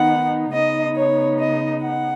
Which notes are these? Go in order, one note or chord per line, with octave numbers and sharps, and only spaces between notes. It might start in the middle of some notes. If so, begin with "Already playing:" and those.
Already playing: D#3 B3 D#4 F#5
C#3 B3 D#4 D#5
C#5
D#5
F#5